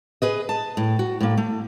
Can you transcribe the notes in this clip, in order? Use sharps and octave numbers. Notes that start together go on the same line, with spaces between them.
G#4 B4 D#5
A5
A2
F#4
A2 A#3
A3